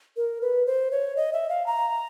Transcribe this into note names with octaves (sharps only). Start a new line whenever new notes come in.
A#4
B4
C5
C#5
D#5
E5
F5
A#5